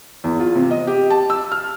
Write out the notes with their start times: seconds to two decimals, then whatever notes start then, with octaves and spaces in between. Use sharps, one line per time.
0.24 E2
0.40 F4
0.55 C3
0.71 D#5
0.87 G4
1.10 A5
1.30 E6
1.52 F6